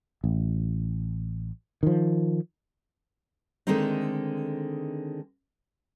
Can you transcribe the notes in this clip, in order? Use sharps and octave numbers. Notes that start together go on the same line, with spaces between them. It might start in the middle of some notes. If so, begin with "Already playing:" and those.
A1
D#3 F3
D3 D#3 G#3 A3 C4 D#4